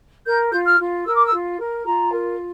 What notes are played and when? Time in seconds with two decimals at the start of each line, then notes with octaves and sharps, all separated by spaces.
0.25 A#4 G6
0.51 F4 G6
0.65 F6
0.79 F4
1.05 A#4 E6
1.15 D6
1.25 E6
1.32 F4
1.59 A#4
1.85 F4 A#5
2.12 A#4